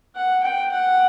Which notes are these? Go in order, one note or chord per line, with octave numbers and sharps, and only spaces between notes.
F#5
G5
F#5